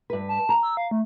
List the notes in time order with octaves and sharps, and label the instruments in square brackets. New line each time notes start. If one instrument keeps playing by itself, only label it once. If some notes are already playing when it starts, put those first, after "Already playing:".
[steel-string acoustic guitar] G2 B4
[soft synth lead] A5
[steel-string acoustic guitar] A#5
[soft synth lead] E6
F5
A3